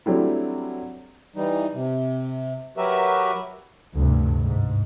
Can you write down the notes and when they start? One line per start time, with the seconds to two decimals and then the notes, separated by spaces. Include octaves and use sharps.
0.06 F#3 G3 A3 C4 D4 E4
1.36 E3 G3 D#4
1.74 C3
2.77 F#3 F#4 G4 A#4 B4 E5
3.96 D2 G2 C3
4.42 G#2